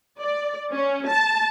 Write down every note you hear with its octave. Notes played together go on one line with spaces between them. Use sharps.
D5
C#4
A5